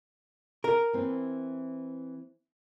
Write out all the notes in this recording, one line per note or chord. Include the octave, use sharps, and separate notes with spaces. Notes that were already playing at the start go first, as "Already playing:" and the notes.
A#4
E3 C4